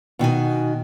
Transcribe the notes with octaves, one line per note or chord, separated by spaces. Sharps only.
B2 D#3 F#4 G#5